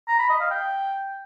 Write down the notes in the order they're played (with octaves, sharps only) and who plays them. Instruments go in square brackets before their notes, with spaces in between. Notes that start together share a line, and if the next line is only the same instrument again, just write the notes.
[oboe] A#5
B5
D#5
F5
G5